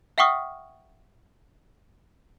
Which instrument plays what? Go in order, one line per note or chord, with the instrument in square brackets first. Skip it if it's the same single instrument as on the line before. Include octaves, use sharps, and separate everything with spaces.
[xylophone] E5 F#5 G5 C#6 D#6 F6